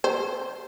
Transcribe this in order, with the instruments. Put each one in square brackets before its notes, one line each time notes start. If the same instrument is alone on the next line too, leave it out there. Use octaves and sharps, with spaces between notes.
[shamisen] C5